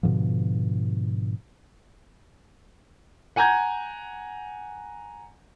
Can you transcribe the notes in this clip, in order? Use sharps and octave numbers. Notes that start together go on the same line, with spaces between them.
G#2 B2 D3 F3
F#5 G#5 A#5 G6 G#6